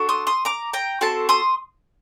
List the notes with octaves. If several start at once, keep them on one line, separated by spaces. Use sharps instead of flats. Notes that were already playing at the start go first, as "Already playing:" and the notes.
Already playing: D4 F#4 A4
C6 D#6
C6 D#6
A#5 D6
G5 A#5
C4 F#4 A4 A5 C6
C6 D#6